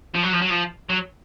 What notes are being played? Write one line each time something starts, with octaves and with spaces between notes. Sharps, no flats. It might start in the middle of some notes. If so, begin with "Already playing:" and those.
F3
F#3
F3
F#3
F3
F#3